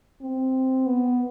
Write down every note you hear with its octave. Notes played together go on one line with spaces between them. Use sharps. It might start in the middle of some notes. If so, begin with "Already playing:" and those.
C4
B3